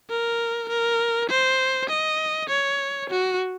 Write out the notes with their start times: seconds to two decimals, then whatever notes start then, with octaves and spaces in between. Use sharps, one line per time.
0.10 A#4
0.69 A#4
1.29 C5
1.89 D#5
2.49 C#5
3.10 F#4